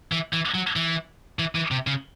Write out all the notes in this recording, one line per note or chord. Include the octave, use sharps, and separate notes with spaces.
E3
E3
F#3
E3
E3
E3
C3
C#3